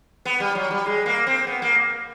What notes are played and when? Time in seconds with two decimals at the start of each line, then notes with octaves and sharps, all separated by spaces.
0.25 B3
0.40 G3
0.55 F#3
0.71 G3
0.86 G#3
1.06 A#3
1.27 C4
1.47 B3
1.62 A#3